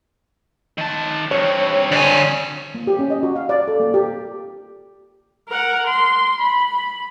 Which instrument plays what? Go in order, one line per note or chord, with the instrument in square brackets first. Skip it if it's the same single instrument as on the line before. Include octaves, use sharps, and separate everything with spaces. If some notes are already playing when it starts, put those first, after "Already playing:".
[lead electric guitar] D#3 A5
[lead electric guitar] G2 C4 [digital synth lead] C#5
[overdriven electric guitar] D3 G#5
[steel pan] A#3
G4
C#4
D#5
F#4
F5
D5
A4
A#3
G4
[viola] A#4 F#5
C6
B5